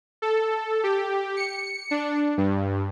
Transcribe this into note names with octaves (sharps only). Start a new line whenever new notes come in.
A4
G4
C#7
D4
G2